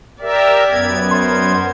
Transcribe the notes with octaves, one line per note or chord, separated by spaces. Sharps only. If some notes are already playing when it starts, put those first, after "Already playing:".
G4 A#4 D5 E5
F#2 B3 G#6
A#4 C5 C6